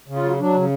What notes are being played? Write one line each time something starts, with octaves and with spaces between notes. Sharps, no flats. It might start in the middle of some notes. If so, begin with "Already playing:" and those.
C#3
F4
F#3
F#3 D4
C#3